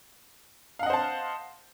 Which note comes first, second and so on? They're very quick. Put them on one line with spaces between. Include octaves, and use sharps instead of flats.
F5 F#5 D#5 C5 A5